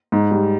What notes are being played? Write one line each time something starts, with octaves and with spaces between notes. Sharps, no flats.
G#2
G3